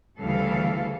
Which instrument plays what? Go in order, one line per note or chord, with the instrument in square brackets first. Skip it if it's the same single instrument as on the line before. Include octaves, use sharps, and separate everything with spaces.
[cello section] D2 C#3 E3 G3 A4 F5